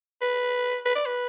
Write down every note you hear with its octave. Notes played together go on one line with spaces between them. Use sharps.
B4
B4
D5
B4